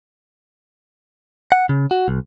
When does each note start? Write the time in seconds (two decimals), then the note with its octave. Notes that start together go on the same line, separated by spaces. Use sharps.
1.52 F#5
1.69 C#3
1.91 F#4
2.08 C2